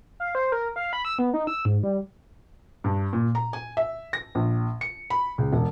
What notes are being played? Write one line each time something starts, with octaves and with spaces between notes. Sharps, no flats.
F5
C5
A#4
F5
B5
E6
B3
D#4
E6
G#2
G3
G2
A#2
A#5
G#5
E5
A#6
A#1
C#7
B5
C#2
E1